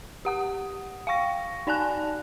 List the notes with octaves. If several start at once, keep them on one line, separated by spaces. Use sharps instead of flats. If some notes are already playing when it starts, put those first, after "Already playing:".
G4 F#5 D#6
F5 G5 C#6 A#6
D#4 D5 G#5 A5 F#6